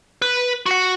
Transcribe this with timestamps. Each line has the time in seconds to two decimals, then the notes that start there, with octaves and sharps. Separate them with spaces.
0.22 B4
0.66 F#4 F#5